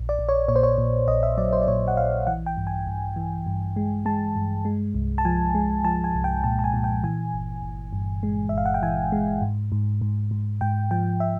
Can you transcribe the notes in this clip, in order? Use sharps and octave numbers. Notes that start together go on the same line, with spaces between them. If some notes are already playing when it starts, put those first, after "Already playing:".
Already playing: A#1
D5
A#1
C#5
A#2 C#5
C5
C#5
A#2
A#1 D#5
E5
F#3 D5
C5
D5
A#2 C#5
F#5
A#1 F5
E3 F#5
G5
G2
G#5
G2
E3
G2
G#3
G#3 A5
G2
G#3
C2
A5
F3 G#5
G#3
F3 A5
G#5
C2
G5
A#2 A5
A5
G#5
A#2
G5
E3 G#5
G1
G1
G2
G#3
E5
G1 F5
F#5
G5
E3 G#5
G#3
G#2
G#2
G#2
G#2
G#2 G5
F3 G5
E5